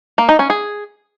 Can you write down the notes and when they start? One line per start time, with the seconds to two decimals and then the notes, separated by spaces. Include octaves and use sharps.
0.18 A#3
0.29 D#4
0.39 C#4
0.50 G#4